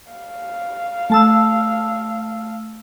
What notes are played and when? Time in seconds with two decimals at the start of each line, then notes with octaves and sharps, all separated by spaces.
0.11 F5
1.10 A3 A5 E6